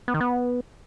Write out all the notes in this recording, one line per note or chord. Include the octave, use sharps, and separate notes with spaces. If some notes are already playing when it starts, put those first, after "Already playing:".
B3
D#3
B3